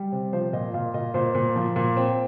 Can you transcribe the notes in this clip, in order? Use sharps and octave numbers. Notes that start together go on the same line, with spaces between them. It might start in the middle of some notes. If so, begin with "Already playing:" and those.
Already playing: G3
C3
F3 C5
A#2 D#5
A#2 F5
A#2 D#5
A#2 C5
A#2
F3
A#2
C4